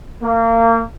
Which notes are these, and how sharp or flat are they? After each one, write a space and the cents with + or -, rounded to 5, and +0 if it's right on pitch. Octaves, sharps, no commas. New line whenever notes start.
A#3 -30